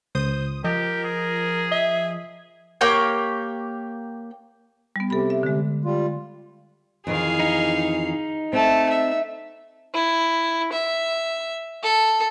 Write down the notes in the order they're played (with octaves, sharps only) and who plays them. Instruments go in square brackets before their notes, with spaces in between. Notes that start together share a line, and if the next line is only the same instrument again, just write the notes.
[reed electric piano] C#2 [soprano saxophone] C5 [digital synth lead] D#6
[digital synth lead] F3 [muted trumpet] G4 [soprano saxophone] A#4 [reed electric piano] D#5
[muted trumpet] G#4
[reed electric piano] D#5 [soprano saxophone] E5
[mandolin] A#3 G4 C#5 G5
[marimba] G3 B3
[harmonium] C3 [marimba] A4 B5
[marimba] E5
D3 G#3
[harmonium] G3 F4
[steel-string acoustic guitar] F2 D#3 E3 [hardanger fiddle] G#4 F5
[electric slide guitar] D#4
[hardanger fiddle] A3 A5 [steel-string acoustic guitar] C4
[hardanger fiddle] E5
[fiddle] E4
E5
A4